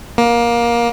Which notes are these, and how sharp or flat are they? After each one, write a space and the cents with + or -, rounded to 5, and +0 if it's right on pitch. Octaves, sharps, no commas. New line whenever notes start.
A#3 +20